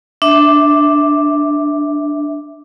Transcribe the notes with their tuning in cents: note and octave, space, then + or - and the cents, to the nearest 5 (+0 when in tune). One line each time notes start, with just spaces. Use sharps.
D4 +0 E5 +0